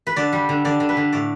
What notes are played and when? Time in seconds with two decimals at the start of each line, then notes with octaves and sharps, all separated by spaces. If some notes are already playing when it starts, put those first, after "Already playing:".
0.07 B4
0.16 D3 D5
0.33 G3
0.49 D3
0.65 D3 D5
0.80 D3
0.89 B4
0.97 D3
1.12 A2 D5